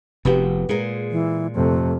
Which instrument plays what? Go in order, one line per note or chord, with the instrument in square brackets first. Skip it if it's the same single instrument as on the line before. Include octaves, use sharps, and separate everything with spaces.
[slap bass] F1 C3 F3 [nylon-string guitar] B3 F#4 G4
[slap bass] A#2 [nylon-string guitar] G#3 G#4 A#4
[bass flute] E3
[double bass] F2 C3 [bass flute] A3